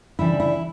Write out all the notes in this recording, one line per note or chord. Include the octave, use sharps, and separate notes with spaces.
D2 C#3 E3 G3 D4 E4
E4